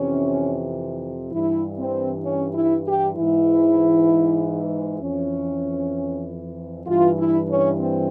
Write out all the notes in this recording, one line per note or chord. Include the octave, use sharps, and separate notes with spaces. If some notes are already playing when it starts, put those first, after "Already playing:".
Already playing: F2 C3 E3 C#4
G2 E3 E4
C4
C#4
E4
G4
G#2 E3 E4
F2 E3 C#4
G2 E3 F4
E4
C#4
C4